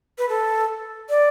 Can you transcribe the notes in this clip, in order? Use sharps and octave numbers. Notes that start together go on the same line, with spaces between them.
B4
A4
D5